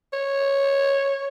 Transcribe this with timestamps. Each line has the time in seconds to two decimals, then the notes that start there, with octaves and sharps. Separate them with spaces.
0.13 C#5